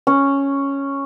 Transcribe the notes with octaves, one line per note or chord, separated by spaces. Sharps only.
C#4